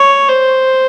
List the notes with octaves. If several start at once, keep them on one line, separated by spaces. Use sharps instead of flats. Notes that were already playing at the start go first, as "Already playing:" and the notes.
Already playing: C#5
C5